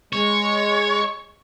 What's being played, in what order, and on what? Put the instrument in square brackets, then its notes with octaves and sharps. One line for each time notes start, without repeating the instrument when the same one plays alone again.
[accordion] G#3 C#6 [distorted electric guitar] C#5